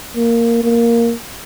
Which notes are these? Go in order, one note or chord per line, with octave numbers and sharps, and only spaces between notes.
A#3
A#3